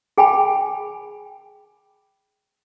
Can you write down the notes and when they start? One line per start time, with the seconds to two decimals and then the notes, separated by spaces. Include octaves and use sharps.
0.18 G#4 G5 G#5 B5